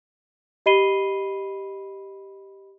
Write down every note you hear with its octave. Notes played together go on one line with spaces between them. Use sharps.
G4 D#5 B5 C7 D#7 G7